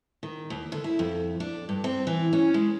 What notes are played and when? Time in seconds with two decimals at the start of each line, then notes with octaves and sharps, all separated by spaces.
0.23 D#3
0.50 D#2
0.72 D3
0.84 E4
0.99 F2
1.40 D4
1.69 G2
1.84 C4
2.07 E3
2.33 C#4
2.54 G#3